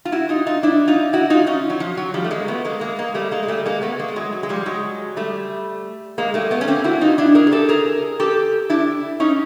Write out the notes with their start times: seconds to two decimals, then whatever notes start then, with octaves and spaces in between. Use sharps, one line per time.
0.05 F4
0.12 E4 F#4
0.29 D#4 F4
0.47 D#4 F4
0.63 D4 E4
0.88 D#4 F4
1.13 E4 F#4
1.30 D#4 F4
1.47 C#4 D#4
1.70 F#3
1.80 F3
1.97 F#3
2.14 F3 G3
2.24 A3
2.31 G#3 A#3
2.48 A3 B3
2.65 G#3 A#3
2.81 G#3 A#3
2.98 G#3 A#3
3.14 G3 A3
3.31 G#3 A#3
3.43 G#3
3.48 G3 A3
3.66 G#3 A#3
3.82 A3 B3
3.99 G#3 A#3
4.08 A3
4.16 F#3 G#3
4.32 F#3
4.43 G#3
4.49 F3 G3
4.66 F#3 G#3
5.16 G3 A3
6.18 G#3 A#3
6.34 G3 A3
6.51 A3 B3
6.61 C#4
6.68 A#3 C4
6.84 E4 F#4
7.01 D#4 F4
7.18 D4 E4
7.35 G#4 A#4
7.47 G#4
7.52 G4 A4
7.69 G#4 A#4
8.20 G4 A4
8.70 D4 E4
9.20 C#4 D#4